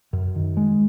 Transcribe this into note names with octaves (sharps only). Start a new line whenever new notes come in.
F#2
D#3
G#3